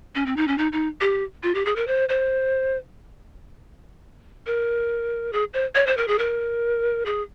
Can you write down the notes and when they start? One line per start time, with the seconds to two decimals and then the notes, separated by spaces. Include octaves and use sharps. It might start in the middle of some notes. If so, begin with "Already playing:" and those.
0.15 C#4
0.26 C4
0.37 D#4
0.48 C#4
0.58 D#4
0.72 D#4
1.01 G4
1.43 F4
1.55 G4
1.65 G#4
1.76 A#4
1.87 C5
2.09 C5
4.46 A#4
5.33 G#4
5.54 C5
5.75 C#5
5.87 C5
5.97 A#4
6.08 G#4
6.19 A#4
7.06 G#4